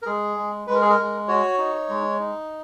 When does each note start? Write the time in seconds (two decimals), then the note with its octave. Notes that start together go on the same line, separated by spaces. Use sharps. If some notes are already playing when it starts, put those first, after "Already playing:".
0.02 A#4
0.06 G#3 G#4
0.37 G#3
0.67 G#3 B4
0.75 A#4
0.82 G#4
0.90 A#4
0.98 G#3
1.28 F#4 C#5
1.58 D#4
1.89 G#3
2.20 D#4